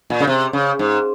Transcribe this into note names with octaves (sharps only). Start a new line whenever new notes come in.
A#2
C#3
C3
C#3
G#2